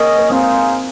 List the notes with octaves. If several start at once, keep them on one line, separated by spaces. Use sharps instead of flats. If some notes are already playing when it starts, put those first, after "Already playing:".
Already playing: A#3 C#4 G#4 D#5
A#3
G#3 C4 D#4 G#4 C5 F5